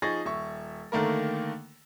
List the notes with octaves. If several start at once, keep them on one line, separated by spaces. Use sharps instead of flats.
F3 D#4 G#4 C#6 A6 A#6
D#1 E5 C#6
D3 D#3 A3 A#3 A#4